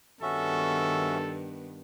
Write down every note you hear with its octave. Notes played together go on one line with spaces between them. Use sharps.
G2 D#3 B3 C#4 F#4 A4 E5